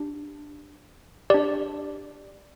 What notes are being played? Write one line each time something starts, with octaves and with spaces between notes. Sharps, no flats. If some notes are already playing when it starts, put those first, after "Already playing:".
Already playing: D4 G4
D4 G4 D5